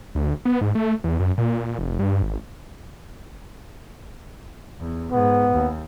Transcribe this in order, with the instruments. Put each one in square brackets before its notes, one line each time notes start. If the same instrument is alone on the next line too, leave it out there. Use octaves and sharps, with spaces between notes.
[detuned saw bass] D2
B3
G#2
A3
E2
F#2
A#2
F1
G2
G#1
[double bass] E2
[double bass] G#2 [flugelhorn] B3
[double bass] D#2